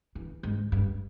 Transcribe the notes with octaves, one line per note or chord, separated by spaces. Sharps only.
E3
G#2
G2